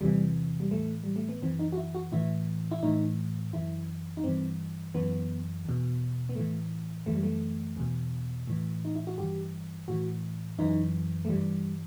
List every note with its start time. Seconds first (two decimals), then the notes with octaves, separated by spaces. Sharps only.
0.01 E2 C3 E3 G3
0.60 G3
0.71 A2 E3 A3
1.04 G3
1.16 A3
1.29 B3
1.42 F#2 E3 C4
1.59 D#4
1.72 F#4
1.77 E4
1.95 F#4
2.12 A2 E3 E4
2.71 E4
2.83 A2 E3 D#4
3.53 F#2 E3 E4
4.17 D#4
4.24 G2 E3 C4
4.94 F#2 E3 B3
5.65 E2 B2
6.29 B3
6.35 A2 E3 A3
7.06 F#2 E3 A3
7.14 G3
7.23 A3
7.77 E2 B2
8.47 A2 E3
8.85 D#4
8.95 E4
9.07 F#4
9.17 G2 E3 G4
9.88 A2 E3 F#4
10.59 F#2 E3 D#4
11.25 A3
11.29 G2 E3 G3